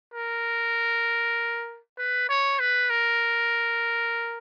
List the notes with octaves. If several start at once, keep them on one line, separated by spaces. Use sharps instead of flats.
A#4
B4
C#5
B4
A#4